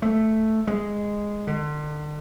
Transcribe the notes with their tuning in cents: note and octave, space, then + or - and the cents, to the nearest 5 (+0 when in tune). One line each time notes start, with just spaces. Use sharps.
A3 +0
G#3 -5
D3 +35